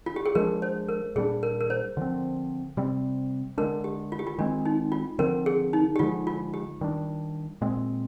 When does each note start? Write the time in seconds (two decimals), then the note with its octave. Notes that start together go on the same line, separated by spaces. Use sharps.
0.06 F4
0.16 G4
0.26 G#4
0.35 F3 G#3 D4 A#4
0.62 C5
0.89 A#4
1.15 A#2 G3 A#3 D4 G#4
1.43 A#4
1.61 A#4
1.70 C5
1.97 D3 F3 C4
2.77 C3 G3 C4
3.58 D3 G#3 D4 A#4
3.84 G4
4.12 F4
4.19 G4
4.27 F4
4.38 D#3 G#3 C4 D4
4.65 D#4
4.92 F4
5.19 D3 F3 C4 A#4
5.46 G#4
5.73 D#4
5.96 G4
5.99 D3 F3 G#3 F4
6.27 F4
6.54 G4
6.81 D#3 G3 D4
7.61 A#2 G#3 C4